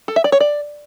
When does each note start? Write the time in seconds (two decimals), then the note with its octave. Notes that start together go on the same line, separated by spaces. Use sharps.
0.08 A4
0.16 E5
0.24 D5
0.32 C#5
0.40 D5